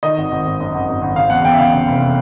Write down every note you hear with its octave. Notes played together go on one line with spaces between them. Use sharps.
D#3 D#5
G#1
G#1
G#1
F#2
G#1
G#1
G#1
C#3 F5
E2 F#5
E2 G5
E5
C#3 F5
C#3
F1